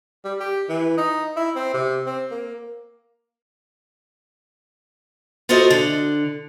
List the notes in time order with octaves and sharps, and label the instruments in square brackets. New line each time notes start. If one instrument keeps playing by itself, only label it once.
[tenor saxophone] G3
G4
E3
D#4
E4
C4
C3
C4
A#3
[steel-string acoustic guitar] F4 F#4 A4 A#4 C5 D#5
D3